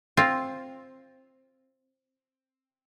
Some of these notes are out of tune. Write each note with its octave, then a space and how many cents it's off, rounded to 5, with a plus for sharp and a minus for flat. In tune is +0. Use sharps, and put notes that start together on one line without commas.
C4 +10 F4 +0